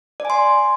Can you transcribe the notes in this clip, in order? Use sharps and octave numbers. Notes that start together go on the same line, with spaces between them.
D5 G#5 C6